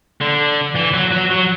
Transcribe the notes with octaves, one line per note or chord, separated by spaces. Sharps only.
D3
E3
F#3
F#3
F#3